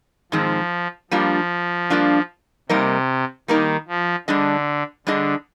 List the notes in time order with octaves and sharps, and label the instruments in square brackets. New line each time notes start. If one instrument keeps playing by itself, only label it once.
[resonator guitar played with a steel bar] G#2 D#3 G#3 C4 [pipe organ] F3
[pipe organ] F3 [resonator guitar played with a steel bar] G3 A#3 D4 F4
[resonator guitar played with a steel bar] G3 A#3 D4 F4
[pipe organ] C3 [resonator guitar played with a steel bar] G3 A#3 D#4 A#4 D#5
[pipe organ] D#3 [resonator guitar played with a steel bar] G3 A#3 D#4 A#4 D#5
[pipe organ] F3
[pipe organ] D3 [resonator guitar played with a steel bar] G3 D4 G#4 D#5
[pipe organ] D3 [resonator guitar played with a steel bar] G3 D4 G#4 D#5